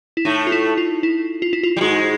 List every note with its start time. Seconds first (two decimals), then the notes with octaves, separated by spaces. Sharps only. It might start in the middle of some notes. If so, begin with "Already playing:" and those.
0.17 E4
0.25 A2 A3 D#4
0.47 F4
0.52 E4
0.77 F4
1.03 E4
1.42 F4
1.53 E4
1.63 F4
1.77 G3
1.81 G#2 G#3 F#4